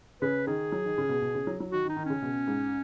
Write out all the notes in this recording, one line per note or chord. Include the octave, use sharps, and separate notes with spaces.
C#3 B4
D#3 G#4
F#3
D#3
C#3
B2
B2
C#3
F#3
F#3
D#3 F#4
D#3
D#4
D#3
C#3 C#4
B2
G#2